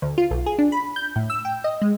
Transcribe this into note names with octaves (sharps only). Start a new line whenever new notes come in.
D2
F4
B1
G#4
D4
B5
G6
A2
E6
G5
D#5
G#3